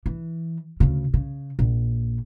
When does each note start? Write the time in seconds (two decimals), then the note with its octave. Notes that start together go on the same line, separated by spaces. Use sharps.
0.06 E3
0.80 D2 C#3
1.14 C#3
1.59 A#1